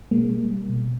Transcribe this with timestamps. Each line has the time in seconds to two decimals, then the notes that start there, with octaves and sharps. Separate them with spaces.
0.11 B2 G#3 A#3
0.31 G3
0.50 G3
0.69 B2